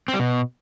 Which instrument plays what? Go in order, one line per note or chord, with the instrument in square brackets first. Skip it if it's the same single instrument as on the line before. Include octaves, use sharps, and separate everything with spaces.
[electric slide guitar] C4
G3
B2